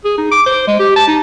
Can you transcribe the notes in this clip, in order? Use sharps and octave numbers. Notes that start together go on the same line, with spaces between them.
G#4
D#4
D6
C5
G#3
G4
A5
D#4